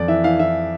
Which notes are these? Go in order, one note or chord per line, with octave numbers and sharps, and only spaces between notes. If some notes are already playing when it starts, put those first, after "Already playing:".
Already playing: F2 D5
E3 E5
E3 F5
E3 E5